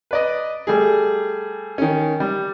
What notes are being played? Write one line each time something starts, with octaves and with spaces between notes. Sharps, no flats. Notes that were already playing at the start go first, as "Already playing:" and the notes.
B4 D5 D#5
G3 A3 G#4
D#3 C#4
G3